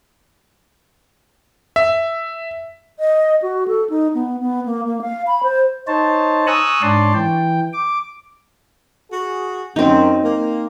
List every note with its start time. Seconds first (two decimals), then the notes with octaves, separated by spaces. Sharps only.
1.76 E5
2.99 D#5
3.42 F#4
3.68 A4
3.90 D#4
4.14 B3
4.40 B3
4.66 A#3
4.85 A#3
5.02 F5
5.27 B5
5.43 C5
5.87 D#4 C5 C#5 A5
6.47 G#5 A#5 C#6 D#6 E6 F#6
6.82 G#2 D4 C#5 D5 A5 C6
7.14 E3 G5
7.73 D6
9.11 F#4 G#4
9.76 F#2 C4 D#4
10.23 A#3